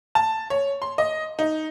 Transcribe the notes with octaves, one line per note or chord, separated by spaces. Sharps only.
A5
C#5
C6
D#5
D#4